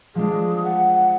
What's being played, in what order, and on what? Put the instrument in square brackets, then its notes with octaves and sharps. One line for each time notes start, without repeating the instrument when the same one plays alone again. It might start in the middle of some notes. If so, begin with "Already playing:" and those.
[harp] F3 G#3 D4 [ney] G#4
[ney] F#5